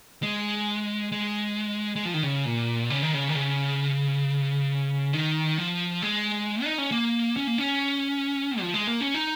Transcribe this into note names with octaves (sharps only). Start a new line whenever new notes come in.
G#3
G#3
G#3
F3
D#3
C#3
A#2
C#3
D#3
C#3
D#3
C#3
D#3
F3
G#3
D#4
C#4
A#3
C#4
A#3
C#4
F3
G#3
A#3
C#4
D#4